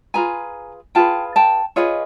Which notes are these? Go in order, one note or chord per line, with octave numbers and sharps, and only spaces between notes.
F4 G#4 B4 G#5 A#5
F4 G#4 B4 G5 A5
G5 A5
F4 G#4 B4 C#5 D#5